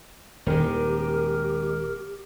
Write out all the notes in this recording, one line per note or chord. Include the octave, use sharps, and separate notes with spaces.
D#1 D#3 G#3 G4 A#4